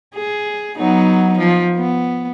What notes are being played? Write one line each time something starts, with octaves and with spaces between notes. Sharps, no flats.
G#4
F#3 B3 D#4
F3
B3